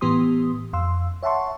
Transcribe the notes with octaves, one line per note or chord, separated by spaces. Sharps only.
A2 E3 B3 G4 C6 D#6
F2 F5 C6 E6
C#5 E5 F#5 A5 C6 C#6